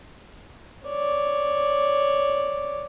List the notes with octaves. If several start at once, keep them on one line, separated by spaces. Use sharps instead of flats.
C#5 D5